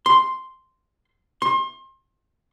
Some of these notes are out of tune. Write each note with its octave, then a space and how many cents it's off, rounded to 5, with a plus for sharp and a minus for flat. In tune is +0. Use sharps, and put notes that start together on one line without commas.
C6 +0
C6 +30